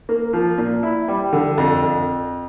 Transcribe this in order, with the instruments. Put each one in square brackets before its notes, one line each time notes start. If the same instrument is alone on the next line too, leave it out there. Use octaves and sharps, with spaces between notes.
[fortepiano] A#3
F3
A#2
E4
G3
D3
F2
F2